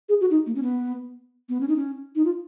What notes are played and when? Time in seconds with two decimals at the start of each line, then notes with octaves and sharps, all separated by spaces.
0.09 G#4
0.21 F#4
0.31 D#4
0.46 A#3
0.55 C#4
0.63 B3
1.49 B3
1.61 C#4
1.69 D#4
1.76 C#4
2.15 D#4
2.25 F4